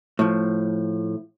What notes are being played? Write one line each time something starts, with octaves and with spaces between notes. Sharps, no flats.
A2 F3